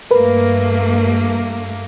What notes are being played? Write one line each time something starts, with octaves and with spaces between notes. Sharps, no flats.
G2 A3 A#3 A#4 B4